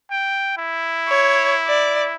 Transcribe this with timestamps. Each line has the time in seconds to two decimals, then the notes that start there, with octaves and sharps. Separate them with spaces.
0.11 G5
0.57 E4
1.08 C#5
1.67 D5